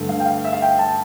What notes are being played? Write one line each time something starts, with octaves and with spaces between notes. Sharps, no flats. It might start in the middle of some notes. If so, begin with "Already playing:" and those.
Already playing: G2 D3 A3
F5
G5
F5
E5
F5
G5
A5